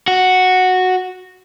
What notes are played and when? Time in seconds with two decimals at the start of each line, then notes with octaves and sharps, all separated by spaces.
0.08 F#4